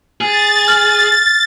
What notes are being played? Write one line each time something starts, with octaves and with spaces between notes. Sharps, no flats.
G#4 A6
F6